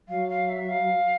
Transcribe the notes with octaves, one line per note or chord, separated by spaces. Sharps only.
F#3 F5
F5
E5
F5